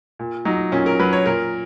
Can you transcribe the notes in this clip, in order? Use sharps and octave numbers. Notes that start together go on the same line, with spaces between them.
A#2
F#3 D#4
A#2 C#4
A#4
F#3 B4
C#5
A#2 A#4